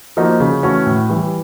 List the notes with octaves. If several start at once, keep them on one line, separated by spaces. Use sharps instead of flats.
F3 A#3 D#4 F#4
C#3
E3 A3 C#4 F#4
A2
E3 G3